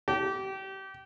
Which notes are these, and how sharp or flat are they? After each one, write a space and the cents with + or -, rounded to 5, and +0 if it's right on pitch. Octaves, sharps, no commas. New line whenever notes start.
G4 -25